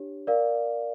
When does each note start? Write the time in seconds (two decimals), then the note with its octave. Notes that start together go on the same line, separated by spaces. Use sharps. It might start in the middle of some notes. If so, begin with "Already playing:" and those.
Already playing: D4 G4 C#5
0.27 A#4 D5 F5